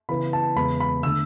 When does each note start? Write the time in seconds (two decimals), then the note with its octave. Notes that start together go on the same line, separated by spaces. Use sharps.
0.09 C#3 E3 B3 B5
0.33 A5
0.56 E2 C#3 G#3 B3 B5
0.80 B5
1.03 D3 A3 E6